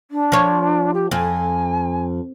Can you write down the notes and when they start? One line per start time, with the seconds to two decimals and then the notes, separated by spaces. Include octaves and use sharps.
0.11 D4
0.32 F3 C#5
0.94 G4
1.11 F2 G#5